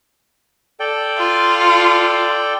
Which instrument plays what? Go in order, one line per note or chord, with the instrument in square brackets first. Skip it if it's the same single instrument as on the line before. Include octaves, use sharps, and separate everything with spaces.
[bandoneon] A4 D5 G5
[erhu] F4